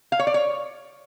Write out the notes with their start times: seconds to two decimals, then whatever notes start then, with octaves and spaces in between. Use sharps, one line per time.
0.12 F5
0.19 C#5
0.27 D5
0.34 C#5